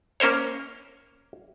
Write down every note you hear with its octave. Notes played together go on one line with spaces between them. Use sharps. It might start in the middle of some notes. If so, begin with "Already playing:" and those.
A#3 C#4 A#4 C5 C#5